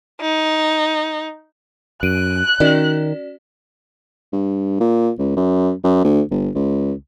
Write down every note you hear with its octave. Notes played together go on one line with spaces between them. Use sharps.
D#4
F#2 F#6 D7 D#7
D#3 C#4 F#4 D5
G2
A#2
C#2
F#2
F#2
D2
G1
C#2